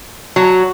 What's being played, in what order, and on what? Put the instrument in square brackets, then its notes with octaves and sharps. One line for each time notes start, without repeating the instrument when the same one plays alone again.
[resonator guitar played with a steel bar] F#3